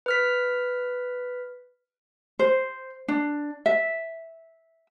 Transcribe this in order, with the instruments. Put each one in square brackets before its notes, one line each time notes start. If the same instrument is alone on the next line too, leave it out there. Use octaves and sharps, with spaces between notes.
[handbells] B4 F6 B6
[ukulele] C5
D4
E5